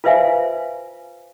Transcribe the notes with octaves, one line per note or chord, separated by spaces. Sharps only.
F4 B4 C5 E5 F5 G#5